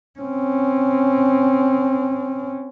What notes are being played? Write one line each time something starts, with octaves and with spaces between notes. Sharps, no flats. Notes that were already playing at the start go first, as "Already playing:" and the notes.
C4 C#4